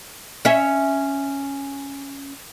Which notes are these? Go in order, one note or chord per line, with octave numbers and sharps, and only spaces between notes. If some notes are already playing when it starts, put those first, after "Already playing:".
C#4 E5